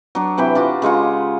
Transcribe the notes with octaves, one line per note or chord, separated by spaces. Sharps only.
F#3 D4
C3 E3 G5 B5
D4 F4 F#4
C#3 G#3 F4 F#5